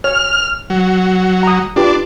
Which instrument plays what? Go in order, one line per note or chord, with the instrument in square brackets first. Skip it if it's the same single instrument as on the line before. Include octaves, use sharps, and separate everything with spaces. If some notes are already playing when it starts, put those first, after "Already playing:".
[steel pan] C#5 [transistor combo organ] F6
[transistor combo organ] F#3
[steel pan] A#5 D#6
[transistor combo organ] D4 [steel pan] F4 G4 B4